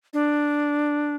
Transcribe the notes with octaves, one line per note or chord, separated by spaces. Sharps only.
D4